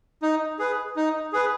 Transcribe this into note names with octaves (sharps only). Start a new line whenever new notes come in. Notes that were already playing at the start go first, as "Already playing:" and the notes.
D#4
G#4 B4
D#4
G#4 B4